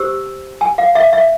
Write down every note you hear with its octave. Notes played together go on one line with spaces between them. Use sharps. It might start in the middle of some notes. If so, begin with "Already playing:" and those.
Already playing: G4 C5 E6
G#5
F5
E5
E5